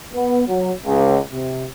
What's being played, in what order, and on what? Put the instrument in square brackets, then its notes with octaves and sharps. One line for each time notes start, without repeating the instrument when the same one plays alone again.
[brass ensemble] B3
F#3
C#2
C3